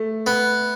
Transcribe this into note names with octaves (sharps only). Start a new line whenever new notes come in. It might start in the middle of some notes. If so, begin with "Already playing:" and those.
Already playing: A3
B3